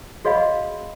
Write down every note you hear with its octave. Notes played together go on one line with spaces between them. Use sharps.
F#4 G#4 C#5 D#5 F5 B5